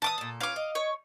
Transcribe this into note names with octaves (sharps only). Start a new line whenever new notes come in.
E3 A5 D6 D#6
A#2 A4
C#4 F4 B4 F5 D6
D#5
C#5